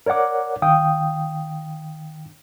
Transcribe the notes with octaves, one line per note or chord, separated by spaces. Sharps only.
A#4 C#5 D5 F#5 D6
D#3 F5 G5 D#6